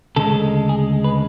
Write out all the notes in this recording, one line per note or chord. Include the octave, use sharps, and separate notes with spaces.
D2 C#3 G#3 A4
G#4
B4